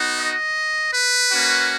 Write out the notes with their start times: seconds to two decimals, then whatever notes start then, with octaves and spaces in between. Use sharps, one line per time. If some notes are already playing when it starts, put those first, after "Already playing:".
Already playing: B3 D#4 F#4
0.17 D#5
0.93 B4
1.31 A#3 C#4 F#4